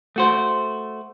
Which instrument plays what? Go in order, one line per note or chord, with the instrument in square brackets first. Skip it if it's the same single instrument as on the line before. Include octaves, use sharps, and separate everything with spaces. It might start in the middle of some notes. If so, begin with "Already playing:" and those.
[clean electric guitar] A3 F#4 C5